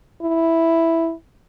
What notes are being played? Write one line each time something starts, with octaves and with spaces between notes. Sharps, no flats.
E4